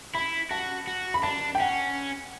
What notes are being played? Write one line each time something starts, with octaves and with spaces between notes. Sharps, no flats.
E4 B5
F#4 A5
F#4
B5
D4 A5
G5
C#4 F#5